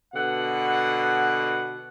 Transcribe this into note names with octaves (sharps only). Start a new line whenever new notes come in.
B2 D3 F#5